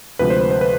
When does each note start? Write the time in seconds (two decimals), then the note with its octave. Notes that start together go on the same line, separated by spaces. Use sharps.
0.19 D2 C3 F3 G#3 B4
0.30 C5
0.41 B4
0.51 C5
0.61 B4